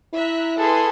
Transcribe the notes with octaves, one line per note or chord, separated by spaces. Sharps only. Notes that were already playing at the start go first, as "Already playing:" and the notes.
E4 E5 A#5 F#6
G#4 A4 B4 C6